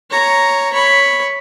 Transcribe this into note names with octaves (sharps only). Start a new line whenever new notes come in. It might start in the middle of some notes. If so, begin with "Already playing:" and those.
C#5 A#5
C#5 B5